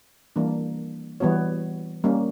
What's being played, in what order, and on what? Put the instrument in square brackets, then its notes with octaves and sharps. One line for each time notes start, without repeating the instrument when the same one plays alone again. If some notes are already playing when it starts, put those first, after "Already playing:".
[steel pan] E3 G3 A#3 D4
E3 G3 B3 F#4 C#5
G3 A#3 C#4